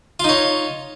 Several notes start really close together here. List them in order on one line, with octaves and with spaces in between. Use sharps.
F4 D#4 C#5